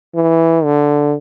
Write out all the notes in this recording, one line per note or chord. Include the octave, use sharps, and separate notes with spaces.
E3
D3